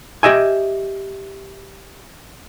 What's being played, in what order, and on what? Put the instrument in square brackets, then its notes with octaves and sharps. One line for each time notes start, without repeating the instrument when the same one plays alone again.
[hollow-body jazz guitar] G4 D#5 E5 G#5